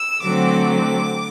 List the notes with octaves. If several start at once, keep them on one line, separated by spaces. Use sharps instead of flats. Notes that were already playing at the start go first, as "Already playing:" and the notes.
Already playing: E6
D3 F#3 A3 C4 D6